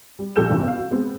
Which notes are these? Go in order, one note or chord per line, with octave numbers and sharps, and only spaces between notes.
G3
A#1 G4 A4 E6 G6 E7
A1 E2 G2 C3
B3 F5
F#4
G#3 B3 C4